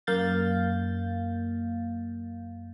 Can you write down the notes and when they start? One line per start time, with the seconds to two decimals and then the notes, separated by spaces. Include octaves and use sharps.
0.07 F#2 A#3 F5 G6 A6